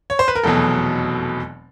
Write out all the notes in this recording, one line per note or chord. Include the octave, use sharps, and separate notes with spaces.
C#5
C5
B4
A#4
F1 E2 B2 F#3 A4